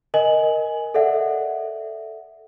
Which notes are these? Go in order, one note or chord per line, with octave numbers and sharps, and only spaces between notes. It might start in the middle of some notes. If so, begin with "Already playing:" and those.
A#4 D#5 G#5 F#7
A4 D5 E5 F#5